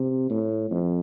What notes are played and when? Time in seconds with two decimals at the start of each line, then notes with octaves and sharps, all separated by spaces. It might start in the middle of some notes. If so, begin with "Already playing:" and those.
Already playing: C3
0.30 A2
0.71 F2